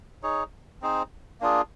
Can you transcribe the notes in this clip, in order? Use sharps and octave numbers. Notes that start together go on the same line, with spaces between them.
D#4 G#4 C#5
C4 D#4 G#4 C5
A#3 D4 F4 G#4